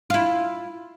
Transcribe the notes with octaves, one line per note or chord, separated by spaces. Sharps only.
E4 F4